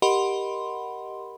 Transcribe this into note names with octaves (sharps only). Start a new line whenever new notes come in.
G4 A#4 D#5 F#5 B5 C6